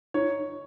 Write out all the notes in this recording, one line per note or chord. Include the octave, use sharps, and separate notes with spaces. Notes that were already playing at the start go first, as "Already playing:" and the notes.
D#4 C#5